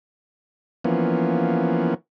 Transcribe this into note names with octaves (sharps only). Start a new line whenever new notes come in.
E3 F3 A#3 B3 C#4